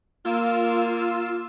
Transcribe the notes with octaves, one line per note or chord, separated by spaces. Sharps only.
A#3 F4 E6